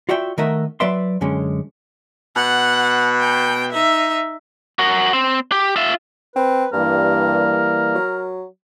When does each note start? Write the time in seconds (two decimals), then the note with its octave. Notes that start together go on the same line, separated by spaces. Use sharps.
0.09 F4 F#4 D5 E5 G5
0.38 D#3 A3 A#4 D#5 E5 F#5
0.80 F#3 B4 D5 E5 C6
1.21 F#2 D3 G#3 C#4
2.36 B2 F#5
3.20 G5
3.72 D#4 E5
4.79 F#4 A#4
5.13 C4
5.52 G4
5.76 F4 E5
6.36 C4 B4
6.73 G2 E3 G3 A#3 A#4
7.95 F#3